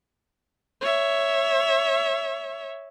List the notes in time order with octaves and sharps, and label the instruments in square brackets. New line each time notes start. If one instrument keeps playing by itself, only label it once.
[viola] C#5 E5